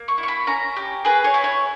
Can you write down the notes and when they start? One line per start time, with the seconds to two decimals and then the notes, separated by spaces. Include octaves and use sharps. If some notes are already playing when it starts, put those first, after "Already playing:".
Already playing: A#3
0.08 C#6
0.18 E4
0.23 C#6
0.28 B5
0.47 C#4 A#5
0.76 G4
1.05 G#4 B4
1.24 C#5
1.34 E4
1.44 C#5